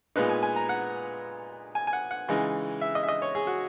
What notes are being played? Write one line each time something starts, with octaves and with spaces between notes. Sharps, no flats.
A#2 G#3 B3 D#4 B4
G#5
G#5
A#5
F#5
G#5
G#5
F#5
F#5
C#3 E3 G#3 D#4
E5
D#5
E5
D#5
C#5
G#4
F#4